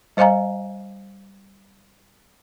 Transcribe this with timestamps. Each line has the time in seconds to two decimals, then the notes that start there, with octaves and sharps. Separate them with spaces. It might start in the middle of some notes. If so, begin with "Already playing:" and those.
0.17 G3 C5 D#5 F5 G#5 A#5